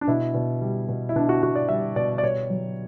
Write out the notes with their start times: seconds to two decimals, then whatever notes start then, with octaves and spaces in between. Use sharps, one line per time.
0.01 D4
0.08 B2 E4
0.34 B2
0.61 G3
0.89 B2
1.09 E4
1.16 B2 D4
1.29 F#4
1.43 B2 F#4
1.56 D5
1.69 G3 E5
1.96 B2 D5
2.18 D5
2.23 B2 C#5
2.50 F#3